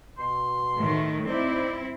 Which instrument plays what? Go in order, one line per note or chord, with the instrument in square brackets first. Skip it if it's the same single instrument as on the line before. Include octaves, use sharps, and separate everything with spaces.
[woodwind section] B2 C6
[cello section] A2 D#3 A3
[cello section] C4 E4 [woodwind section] D#4 C5 D5